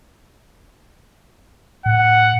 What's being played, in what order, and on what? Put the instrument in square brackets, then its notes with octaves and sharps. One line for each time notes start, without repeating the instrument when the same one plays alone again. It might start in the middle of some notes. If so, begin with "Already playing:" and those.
[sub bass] A2 [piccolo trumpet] F#5